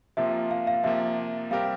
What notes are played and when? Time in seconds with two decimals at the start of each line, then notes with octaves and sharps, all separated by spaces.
0.17 C3 F3 A#3 F4 E5
0.51 F5
0.67 F5
0.84 C3 F3 A#3 E5
1.51 G3 C4 G4 A#4 F5